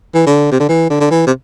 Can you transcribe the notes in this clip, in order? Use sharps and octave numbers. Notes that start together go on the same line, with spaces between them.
E3
D3
C3
D3
E3
D3
D3
E3
C3